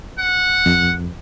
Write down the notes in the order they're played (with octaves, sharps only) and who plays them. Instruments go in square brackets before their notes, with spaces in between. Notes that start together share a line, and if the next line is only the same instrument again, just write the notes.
[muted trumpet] F#5
[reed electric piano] F2